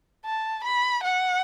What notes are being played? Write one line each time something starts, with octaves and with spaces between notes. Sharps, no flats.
A5
B5
F#5